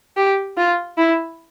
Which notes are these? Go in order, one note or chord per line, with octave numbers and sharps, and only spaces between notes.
G4
F4
E4